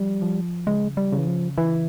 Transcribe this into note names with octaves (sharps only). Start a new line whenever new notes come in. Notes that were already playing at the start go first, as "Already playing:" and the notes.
Already playing: F3 G3
F3
C#3 G#3
G3
C#3
E3
F3
E3 E4